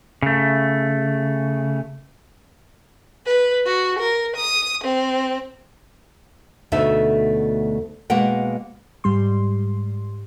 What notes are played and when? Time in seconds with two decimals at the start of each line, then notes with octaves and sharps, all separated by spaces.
0.22 C#3 A3
3.26 B4
3.66 F#4
4.00 A#4
4.36 D#6
4.83 C4
6.72 D2 B2 A3 D#4 E5 A5
8.10 B2 G#3 A#3 B4 F#5 G5
9.04 G#2 G3 C6